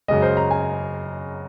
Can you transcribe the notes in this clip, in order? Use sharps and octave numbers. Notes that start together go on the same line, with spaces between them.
F#2 C#3 G#3 D#5
C5
A#5
G#5